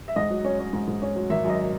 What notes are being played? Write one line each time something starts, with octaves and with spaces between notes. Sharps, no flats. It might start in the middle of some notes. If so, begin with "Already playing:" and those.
E5
G#2 D#5
F#3
C#4
C#4
G#2
G#2
C#4
F#3
G#1 E5
F#2 D#5